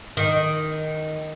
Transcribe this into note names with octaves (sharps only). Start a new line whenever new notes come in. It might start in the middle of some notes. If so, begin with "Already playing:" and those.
D#3